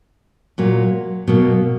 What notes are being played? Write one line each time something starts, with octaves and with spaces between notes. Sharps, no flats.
A#2 F#3 A#3
B2 F#3 A#3